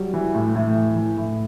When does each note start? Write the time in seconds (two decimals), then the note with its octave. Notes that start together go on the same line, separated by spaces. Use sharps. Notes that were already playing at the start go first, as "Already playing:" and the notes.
Already playing: F#3 G3
0.14 E3
0.35 A2
0.55 A2
0.75 E3
0.96 E3
1.17 A2